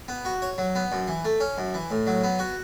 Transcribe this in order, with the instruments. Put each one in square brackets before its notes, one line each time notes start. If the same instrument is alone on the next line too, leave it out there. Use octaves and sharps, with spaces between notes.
[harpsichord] B3
F#4
C#5
F#3
B3
F#2
E3
A3
C#4
F#2
E3
A2
F#3
B3
F#4